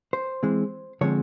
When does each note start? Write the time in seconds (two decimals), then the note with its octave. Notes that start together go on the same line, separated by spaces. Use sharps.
0.13 C5
0.43 E3 G#3 C4
1.01 D3 F3 G#3 C4 C#5